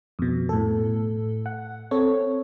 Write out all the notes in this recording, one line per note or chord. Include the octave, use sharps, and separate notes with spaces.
F2 B2
A2 A4
F#5
C4 A4 C#5